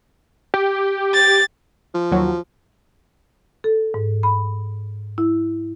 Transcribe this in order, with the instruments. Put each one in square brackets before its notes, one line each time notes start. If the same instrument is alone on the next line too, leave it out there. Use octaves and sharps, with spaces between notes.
[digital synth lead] G4
[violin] A6
[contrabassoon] F3
[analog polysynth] D#2 F#3
[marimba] A4
G#2
B5
E4